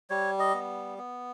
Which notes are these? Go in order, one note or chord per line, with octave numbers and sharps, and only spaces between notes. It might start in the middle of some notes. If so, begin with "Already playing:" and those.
G3 C#5
D#5
B3
B3